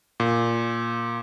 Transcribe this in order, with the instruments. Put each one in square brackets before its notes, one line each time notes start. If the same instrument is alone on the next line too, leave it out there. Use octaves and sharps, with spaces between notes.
[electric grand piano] A#2